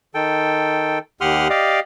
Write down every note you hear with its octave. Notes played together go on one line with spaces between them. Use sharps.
D#3 A4 G5
D#2 G4 F#5 C6 D#6 F6
G4 D5 D#5 F5